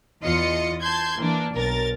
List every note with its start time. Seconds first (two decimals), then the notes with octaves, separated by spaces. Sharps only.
0.22 E2 E3 F4 D#5 C6 C#7
0.80 A5 C6 G6 G#6
1.17 E3 A#3 D4
1.53 B1 A#4 A6